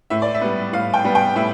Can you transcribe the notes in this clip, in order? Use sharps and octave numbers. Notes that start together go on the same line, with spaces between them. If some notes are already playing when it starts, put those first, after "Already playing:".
A2 E5
D5
E5
G3 B3
A2 F5
G5
G3 B3
G5
A2 E5